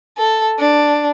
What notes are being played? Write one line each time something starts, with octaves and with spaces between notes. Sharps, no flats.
A4
D4